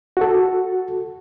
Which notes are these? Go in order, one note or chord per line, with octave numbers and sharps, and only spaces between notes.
F#4 A4